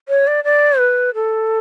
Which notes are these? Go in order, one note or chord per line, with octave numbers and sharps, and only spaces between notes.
C#5
D5
D5
B4
A4